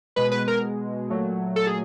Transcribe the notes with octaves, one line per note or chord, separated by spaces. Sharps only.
B2 G#3 B4
B4
A#4
A#2 F#3 A3
A4
G#4